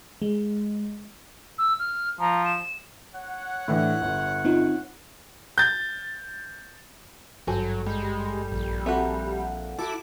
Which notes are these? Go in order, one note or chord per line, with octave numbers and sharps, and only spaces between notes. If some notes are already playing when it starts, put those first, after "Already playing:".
G#3
E6
F6
F3 A#5
E7
C#5 F#5
A2 E3 D4
G1
C4 D#4 F4
G6 A6
G#1 G2 F#3 F#4 A4 C5 G#5
G3 G#3
A#1
C4 F#4 A4 E5 F#5
E4 F#4 A4 D6